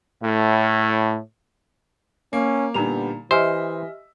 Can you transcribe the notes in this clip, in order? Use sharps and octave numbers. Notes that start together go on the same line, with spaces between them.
A2
A#3 C#4
A#2 D3 G3 B3 D#4 A#5 F7
E3 G4 C5 D#5 E5 G#5 F6